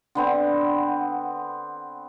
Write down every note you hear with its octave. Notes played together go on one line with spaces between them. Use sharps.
D3 B3 C4